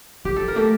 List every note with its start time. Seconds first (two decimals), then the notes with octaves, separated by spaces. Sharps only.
0.25 D3 G4
0.36 F3 A4
0.48 A#4
0.55 A3 G4 A4